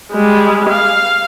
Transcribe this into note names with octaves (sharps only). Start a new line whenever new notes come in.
G3 G#3
F5